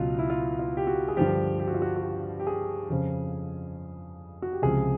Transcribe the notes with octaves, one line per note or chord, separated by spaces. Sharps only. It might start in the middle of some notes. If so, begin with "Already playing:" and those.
Already playing: C#2 B2 F#3 F4
E4
F4
F4
G4
F#4
G#4
G2 D3 F3 G4
G4
F#4
F4
F#4
F#4
G4
G4
G#4
F2 C#3 F3
F#4
G4
C#2 C3 F3 G#4